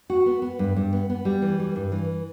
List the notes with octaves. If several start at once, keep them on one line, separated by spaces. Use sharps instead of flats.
F#4
B3
B3
G2
G2
B3
B3
G3
E3
G3
G2
E3